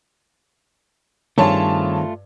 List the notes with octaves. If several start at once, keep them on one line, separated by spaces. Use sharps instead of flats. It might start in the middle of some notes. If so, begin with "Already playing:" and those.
G2 D#3 A3 C4 F4 G#4 C#5 A5